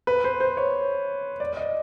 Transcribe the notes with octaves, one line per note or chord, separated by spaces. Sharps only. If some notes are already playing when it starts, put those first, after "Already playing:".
B4
C5
C5
C#5
D5
D5
D#5